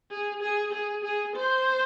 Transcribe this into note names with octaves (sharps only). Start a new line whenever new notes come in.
G#4
G#4
G#4
G#4
C5